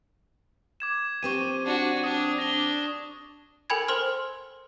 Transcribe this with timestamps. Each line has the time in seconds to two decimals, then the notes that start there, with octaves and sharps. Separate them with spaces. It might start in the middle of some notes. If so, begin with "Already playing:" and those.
0.80 D6 G#6 E7
1.23 F3 C4 G4 C#6 D#7
1.66 D4 F#4
2.04 D4 D#6
2.38 D4 A#6 G7
3.70 A4 A#4 G5 G#5 B5 G#6
3.88 A#4 C5 C6 F6